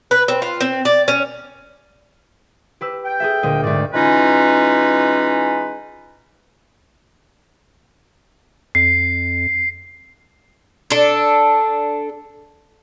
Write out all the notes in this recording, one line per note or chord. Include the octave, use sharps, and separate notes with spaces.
B4
C4
F4
C4
D5
C#4
G4 B4 E6
G5
G#4 A4 E5
D2 A#2 D#5
D2 G#2 A3 D5
E3 G#3 C#4 D#4 F4 B4
F2 C7
D4 A4